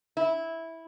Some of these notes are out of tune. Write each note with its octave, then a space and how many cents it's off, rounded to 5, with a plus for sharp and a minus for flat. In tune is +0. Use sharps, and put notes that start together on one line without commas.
E4 -10